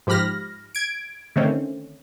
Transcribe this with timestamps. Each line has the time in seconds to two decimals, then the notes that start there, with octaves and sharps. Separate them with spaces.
0.07 G#2 F3 G4 B5 F6 A#6
0.75 G#6 D7
1.36 D3 D#3 A3 C4 C#4